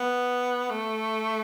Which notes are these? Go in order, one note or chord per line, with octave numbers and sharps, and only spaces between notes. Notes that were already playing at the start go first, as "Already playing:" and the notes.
Already playing: B3
A3